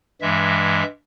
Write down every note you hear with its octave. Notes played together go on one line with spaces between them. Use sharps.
G2 E3 G#3 E5